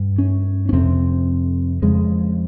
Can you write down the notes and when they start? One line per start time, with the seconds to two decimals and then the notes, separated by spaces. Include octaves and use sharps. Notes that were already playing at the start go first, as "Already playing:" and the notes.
Already playing: G2
0.18 C#4
0.69 C#4
0.73 F2 C3 C4
1.82 F2 C#3 G#3